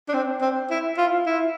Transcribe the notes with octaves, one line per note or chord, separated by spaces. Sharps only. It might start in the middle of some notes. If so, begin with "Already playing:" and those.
D4
C4
C4
E4
F4
E4